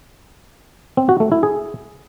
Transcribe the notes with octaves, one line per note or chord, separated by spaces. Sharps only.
C4
F#4
A3
E4
G#4